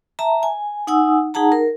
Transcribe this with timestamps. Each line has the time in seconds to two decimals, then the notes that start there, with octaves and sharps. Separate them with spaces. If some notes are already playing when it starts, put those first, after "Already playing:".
0.19 E5 A5 A#5
0.43 G#5
0.87 D#4 F#5 G#5 D#6 E6
1.34 D#4 G#4 F#5 A5 A#5
1.52 A#4